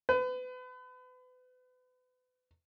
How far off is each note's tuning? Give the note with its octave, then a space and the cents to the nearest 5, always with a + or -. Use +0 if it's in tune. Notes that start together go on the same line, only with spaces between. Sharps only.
B4 +35